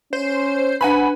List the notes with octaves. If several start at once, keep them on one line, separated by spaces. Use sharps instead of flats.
C#4 C5
D4 B4 F#5 G#5 B5